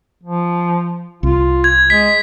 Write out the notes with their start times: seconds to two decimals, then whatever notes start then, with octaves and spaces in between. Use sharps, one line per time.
0.23 F3
1.23 C2 F4
1.64 G#6
1.90 G#3 B6